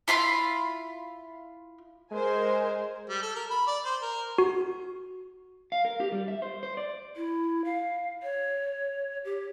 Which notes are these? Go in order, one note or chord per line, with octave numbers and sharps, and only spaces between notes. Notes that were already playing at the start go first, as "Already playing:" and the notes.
E4 F4 B5 C6
G#3 A#4 C5 G#5
G3
A4
A#4
B5
D5
C5
A#4
F#4
F5
A#4
G4
G3
E5
C5
C5
D5
E4
F5
C#5
G4